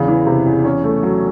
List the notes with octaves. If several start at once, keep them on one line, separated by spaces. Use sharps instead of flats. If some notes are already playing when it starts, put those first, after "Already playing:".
Already playing: E2 C#3
E3
C3
E2
C#4
A3
F#3